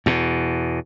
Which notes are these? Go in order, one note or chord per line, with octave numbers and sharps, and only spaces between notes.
E2 B2